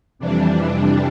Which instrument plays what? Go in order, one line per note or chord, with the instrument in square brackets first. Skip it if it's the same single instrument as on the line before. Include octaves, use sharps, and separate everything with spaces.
[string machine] F2 C3 E3 G3 D4